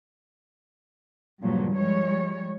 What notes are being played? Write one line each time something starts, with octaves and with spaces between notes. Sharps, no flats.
G2 A#2 C#3 F3 F#3
F3 G3 G#3 C#5